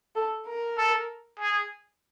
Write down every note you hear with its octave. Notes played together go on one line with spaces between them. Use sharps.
A4
A#4
A4
G#4